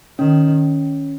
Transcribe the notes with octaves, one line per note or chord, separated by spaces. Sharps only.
D#3 C#4